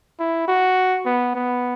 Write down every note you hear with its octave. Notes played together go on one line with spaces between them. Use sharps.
E4
F#4
B3
B3